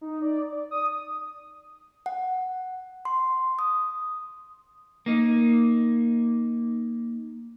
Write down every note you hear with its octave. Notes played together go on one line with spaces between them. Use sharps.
D#4
D5
D5
D#6
F#5
C6
D#6
A#3 D#4